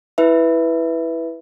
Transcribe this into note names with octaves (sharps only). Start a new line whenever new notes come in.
E4 B4 E5